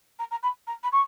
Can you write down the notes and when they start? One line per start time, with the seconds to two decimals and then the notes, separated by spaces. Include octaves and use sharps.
0.19 A#5
0.31 A#5
0.43 B5
0.67 A#5
0.83 B5
0.92 C#6